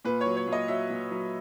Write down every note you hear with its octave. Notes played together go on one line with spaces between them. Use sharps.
A#2 B4
C#5
F#3
C#5
A#2
D#5
F#3 E5
A#2
F#3